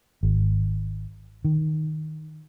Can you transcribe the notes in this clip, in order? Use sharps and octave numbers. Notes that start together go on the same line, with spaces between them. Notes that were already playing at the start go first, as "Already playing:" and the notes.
G#1
D#3